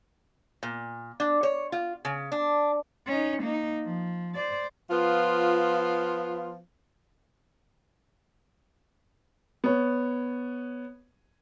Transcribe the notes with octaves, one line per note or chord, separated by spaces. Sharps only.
A#2
D4
C#5
F4
C#3
D4
C#4 D#4
A#3 D#4
F3
C5 D5
F3 B3 F4
B3 C#5